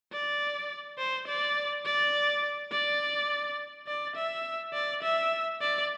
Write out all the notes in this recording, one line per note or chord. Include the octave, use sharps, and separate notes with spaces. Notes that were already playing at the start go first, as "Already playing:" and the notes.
D5
C5
D5
D5
D5
D5
E5
D5
E5
D5